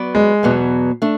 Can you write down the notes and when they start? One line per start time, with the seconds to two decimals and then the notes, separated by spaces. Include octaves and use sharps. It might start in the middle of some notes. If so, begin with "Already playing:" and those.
Already playing: F#3 B3 F#4 B4 D5
0.15 G#3
0.43 E2 B2 F#3 B3
1.02 A3 D4